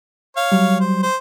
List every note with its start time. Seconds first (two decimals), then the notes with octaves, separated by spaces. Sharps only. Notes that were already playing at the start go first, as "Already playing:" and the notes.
0.37 C#5 F5
0.52 F#3 G3
0.80 C5
1.03 C5